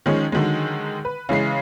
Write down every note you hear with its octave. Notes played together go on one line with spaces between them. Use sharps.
D#3 F3 G#3 C#4
D3 D#3 F#3 G#3
B4
C#3 E3 G#3 C7